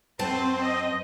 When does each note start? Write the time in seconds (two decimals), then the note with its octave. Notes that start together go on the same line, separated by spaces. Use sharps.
0.19 F#2 C4 B4 C5 A5
0.61 D#5